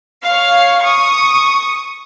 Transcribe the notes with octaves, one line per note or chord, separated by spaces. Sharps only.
C#5 F5
C#6 D#6